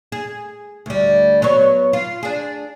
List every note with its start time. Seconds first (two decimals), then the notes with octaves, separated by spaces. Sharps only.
0.12 G#4
0.86 D2 G3
1.42 F#3 B3 C#5
1.93 F4
2.23 D4 G#4